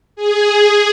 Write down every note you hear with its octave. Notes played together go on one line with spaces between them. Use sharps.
G#4